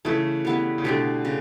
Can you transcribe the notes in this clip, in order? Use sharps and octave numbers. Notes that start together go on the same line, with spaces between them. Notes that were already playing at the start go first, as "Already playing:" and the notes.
C#3 E3 A3 E4 A4
G3 B3 E4 B4
C#3
B2 D3 A3 D4 G4
C#3